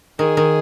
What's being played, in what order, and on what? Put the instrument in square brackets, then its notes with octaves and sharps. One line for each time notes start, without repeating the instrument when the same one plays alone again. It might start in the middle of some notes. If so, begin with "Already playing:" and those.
[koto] D#3 [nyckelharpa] G#4
[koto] D#3